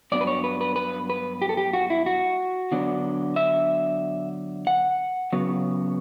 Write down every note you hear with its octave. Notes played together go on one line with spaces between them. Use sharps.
G2 F#3 B3 D4 D5
B4
C#5
B4
B4
B4
B4
G4
A4
G4
F#4
E4
F#4
D3 F#3 B3 D4
E5
F#5
C#3 F#3 B3